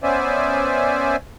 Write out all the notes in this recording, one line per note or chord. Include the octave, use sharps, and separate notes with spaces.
B3 C#4 C5 D5 E5 G#5